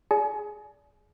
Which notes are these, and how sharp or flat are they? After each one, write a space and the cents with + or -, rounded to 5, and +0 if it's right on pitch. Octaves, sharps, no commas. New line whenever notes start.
G#4 +0 D5 -25 G#5 +35